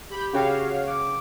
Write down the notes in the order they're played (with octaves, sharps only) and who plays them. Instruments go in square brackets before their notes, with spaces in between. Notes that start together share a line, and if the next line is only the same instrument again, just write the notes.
[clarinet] G4 [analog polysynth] B5 G6
[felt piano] C#3 G5 [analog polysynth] F#4 C#5 F5
[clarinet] D6